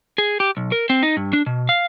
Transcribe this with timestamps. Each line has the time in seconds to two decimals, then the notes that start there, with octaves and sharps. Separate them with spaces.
0.18 G#4
0.40 G4
0.57 B1
0.72 A#4
0.90 C4
1.03 D#4
1.17 G2
1.33 D4
1.46 B2
1.69 F5